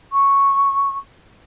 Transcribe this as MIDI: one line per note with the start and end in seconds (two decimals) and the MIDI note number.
0.12 0.97 85